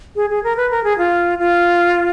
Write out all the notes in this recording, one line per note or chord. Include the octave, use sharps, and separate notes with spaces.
G#4
G#4
A#4
B4
A#4
G#4
F4
F4